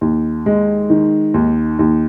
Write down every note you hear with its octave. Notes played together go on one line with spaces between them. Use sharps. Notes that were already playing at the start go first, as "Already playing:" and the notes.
D#2
G#3
D#3
D#2
D#2